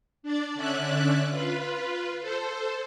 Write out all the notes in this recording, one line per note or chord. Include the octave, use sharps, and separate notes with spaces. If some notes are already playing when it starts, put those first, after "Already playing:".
D4 D5
D3 C#4 D5 E5 F#6
F4 B4
A4 C5